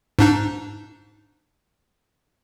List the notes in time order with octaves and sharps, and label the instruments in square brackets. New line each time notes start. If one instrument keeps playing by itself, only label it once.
[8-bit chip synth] G#2 D4 D#4